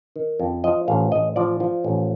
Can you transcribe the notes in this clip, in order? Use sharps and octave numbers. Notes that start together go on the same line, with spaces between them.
D#3
F2
F3 D#5
A1 F5
A1 D#5
F3 D5
F3
A1